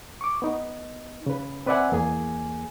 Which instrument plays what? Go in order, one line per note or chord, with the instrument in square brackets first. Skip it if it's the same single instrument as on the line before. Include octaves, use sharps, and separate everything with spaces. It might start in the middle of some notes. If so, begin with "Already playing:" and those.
[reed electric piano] C#6 D6
B3 D#4
C#3 B4
C4 B4 D5 E5 F#5 G#5
E2 A#3 G#4 G#5